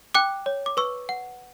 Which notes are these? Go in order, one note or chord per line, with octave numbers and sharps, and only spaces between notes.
G5 D6 F#6
C#5
D6
B4 C#6 E6
F#5